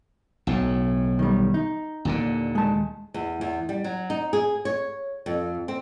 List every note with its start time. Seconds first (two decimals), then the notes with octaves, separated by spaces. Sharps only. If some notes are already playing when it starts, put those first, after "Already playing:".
0.47 B1 A2
1.19 D#3 G3
1.54 D#4
2.05 D#2 A#2 D3
2.55 G#3 A5
3.14 E2
3.41 E2
3.69 G3
3.84 F#3
4.10 D#4
4.33 G#4
4.65 C#5
5.26 F2
5.68 C4